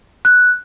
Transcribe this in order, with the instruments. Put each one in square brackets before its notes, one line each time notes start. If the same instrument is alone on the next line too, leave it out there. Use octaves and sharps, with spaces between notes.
[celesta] F#6